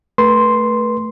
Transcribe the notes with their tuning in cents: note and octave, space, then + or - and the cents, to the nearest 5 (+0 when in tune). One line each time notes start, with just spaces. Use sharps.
A3 +0 B4 -30 C6 +0